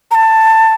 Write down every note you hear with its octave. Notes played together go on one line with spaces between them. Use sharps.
A#5
A5